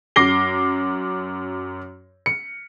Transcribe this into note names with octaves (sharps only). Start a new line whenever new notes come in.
F#2 D6 A#6 C7 G7
C#7